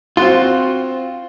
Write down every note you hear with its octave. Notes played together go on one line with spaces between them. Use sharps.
C4 F4 F#4 C6